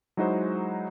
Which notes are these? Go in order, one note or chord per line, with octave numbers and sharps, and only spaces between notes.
F#3 G#3 D#4 E4 F#4 C5